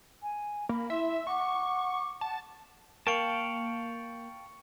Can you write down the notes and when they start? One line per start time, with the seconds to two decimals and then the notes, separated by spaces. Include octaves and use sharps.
0.22 G#5
0.69 A#3 B5
0.90 E4 E5 C6
1.27 F#5 C#6 D6
2.21 F#5 A5
3.07 A#3 F5 G5 A5 C#6 C#7 F#7